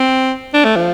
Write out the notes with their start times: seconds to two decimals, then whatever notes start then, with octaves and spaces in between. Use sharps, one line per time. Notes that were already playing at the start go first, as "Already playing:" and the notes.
Already playing: C4
0.54 D4
0.65 A3
0.76 F3